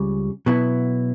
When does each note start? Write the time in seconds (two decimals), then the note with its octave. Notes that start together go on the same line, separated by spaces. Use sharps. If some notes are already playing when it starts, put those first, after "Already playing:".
Already playing: C#2 C#3 G3
0.46 B2 F#3 B3 E4